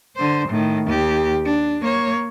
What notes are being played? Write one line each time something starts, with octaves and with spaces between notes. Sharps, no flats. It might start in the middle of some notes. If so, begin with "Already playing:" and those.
D3 C5
A2 D#3
D#2 G4
D4
A#3 C#5